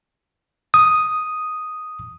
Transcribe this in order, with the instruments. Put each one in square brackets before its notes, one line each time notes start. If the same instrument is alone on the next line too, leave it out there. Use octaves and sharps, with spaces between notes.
[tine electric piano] D#6